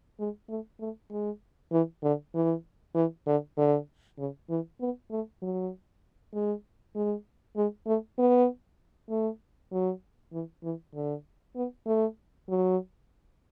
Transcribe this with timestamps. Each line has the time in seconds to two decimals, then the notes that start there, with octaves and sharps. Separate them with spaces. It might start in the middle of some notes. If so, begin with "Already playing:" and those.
0.20 G#3
0.49 A3
0.80 A3
1.11 G#3
1.72 E3
2.04 D3
2.35 E3
2.95 E3
3.27 D3
3.58 D3
4.18 C#3
4.49 E3
4.81 B3
5.11 A3
5.42 F#3
6.34 G#3
6.95 G#3
7.56 G#3
7.87 A3
8.19 B3
9.10 A3
9.72 F#3
10.33 E3
10.63 E3
10.95 D3
11.56 B3
11.87 A3
12.49 F#3